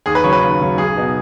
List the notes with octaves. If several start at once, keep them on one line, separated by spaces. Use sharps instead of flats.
D#2 G#4
B4
C#3 F#3 C#5
B4
D#2
C#3 F#3
B1 G#4
B2 B3 D#4